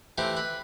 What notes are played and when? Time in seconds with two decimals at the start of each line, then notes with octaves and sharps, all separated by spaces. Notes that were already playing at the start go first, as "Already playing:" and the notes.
0.18 E3 A3 C4 G4
0.37 B4